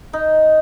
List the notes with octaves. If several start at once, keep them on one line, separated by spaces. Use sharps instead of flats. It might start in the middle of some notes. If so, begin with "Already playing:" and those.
D#4